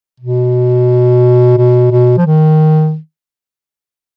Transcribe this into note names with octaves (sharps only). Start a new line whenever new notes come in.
B2
B2
B2
F3
D#3